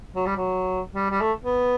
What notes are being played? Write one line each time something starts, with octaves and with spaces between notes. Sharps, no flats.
F#3
G3
F#3
G3
G3
A3
B3